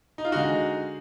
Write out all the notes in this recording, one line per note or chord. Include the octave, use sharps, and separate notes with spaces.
D#4
F4
D3 G#3 D#4 F#4